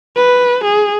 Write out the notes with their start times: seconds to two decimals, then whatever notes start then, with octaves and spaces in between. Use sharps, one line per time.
0.16 B4
0.64 G#4